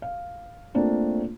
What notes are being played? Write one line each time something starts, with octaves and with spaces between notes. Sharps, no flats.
F5
A3 A#3 C4 D4 F4